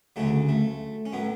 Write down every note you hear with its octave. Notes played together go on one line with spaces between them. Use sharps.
D2 C#3 F#3 A3 C#4
A3
C#4
A2 F#3 B3